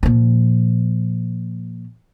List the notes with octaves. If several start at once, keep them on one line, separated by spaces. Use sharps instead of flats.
A#2 F3